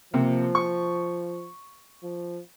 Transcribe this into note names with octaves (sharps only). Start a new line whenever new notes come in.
C3 F3 A#3
C#6
F3